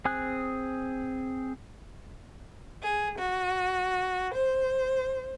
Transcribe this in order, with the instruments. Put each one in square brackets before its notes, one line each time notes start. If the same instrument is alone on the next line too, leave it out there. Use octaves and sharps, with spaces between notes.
[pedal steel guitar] C4 G#4 G#5 D#6 F#6
[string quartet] G#4
F#4
C5